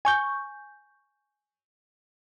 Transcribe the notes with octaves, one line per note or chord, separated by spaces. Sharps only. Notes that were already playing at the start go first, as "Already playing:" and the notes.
G#5 C#6 G6